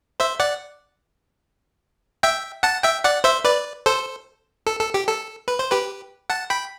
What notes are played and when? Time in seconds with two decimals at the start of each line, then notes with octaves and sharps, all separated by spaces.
0.20 C5 E5
0.40 D5 F#5
2.23 E5 G5
2.63 F#5 A5
2.83 E5 G5
3.04 D5 F#5
3.24 C5 E5
3.44 B4 D5
3.86 A4 C5
4.66 A4
4.80 A4
4.94 G4
5.08 A4
5.48 B4
5.59 C5
5.71 G4 B4
6.30 F#5 A5
6.50 G5 B5